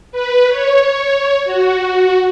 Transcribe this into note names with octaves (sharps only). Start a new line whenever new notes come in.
B4
C#5
F#4